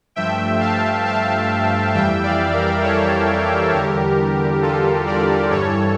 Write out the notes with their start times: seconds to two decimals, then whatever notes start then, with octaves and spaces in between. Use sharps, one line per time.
0.16 G2 F3 A3 E5 G5
0.60 F5 A5
1.05 F5 A5
1.94 F2 E3 G3 E5 G5
2.23 D5 F5
2.53 A#4 D5
2.83 A4 C#5
3.73 E2 D3 G3 G4 A#4
4.62 F4 A4
5.06 A#4 D5
5.51 G2 E3 G3 A4 C#5